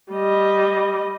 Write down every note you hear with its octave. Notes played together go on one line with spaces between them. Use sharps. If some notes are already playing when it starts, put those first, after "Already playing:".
G3 D#5